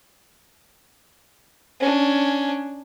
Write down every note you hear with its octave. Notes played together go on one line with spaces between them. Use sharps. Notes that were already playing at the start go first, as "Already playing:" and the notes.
C#4 D4